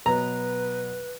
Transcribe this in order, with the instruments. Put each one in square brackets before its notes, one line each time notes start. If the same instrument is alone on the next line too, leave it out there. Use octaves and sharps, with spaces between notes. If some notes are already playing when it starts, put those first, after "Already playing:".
[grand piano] B2 F#3 B3 [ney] B4 [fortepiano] A#5